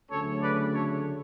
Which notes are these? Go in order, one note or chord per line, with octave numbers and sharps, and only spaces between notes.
D2 C#3 F#3 A3 C#4 A4 C#5
B4 D5
A4 C#5